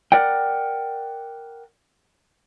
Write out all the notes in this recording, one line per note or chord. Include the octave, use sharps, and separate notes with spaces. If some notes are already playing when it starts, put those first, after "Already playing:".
A#4 D5 F#5 G5